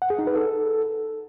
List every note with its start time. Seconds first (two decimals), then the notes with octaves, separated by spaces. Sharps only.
0.02 F#5
0.10 G#4
0.19 D#4
0.27 B4
0.35 A4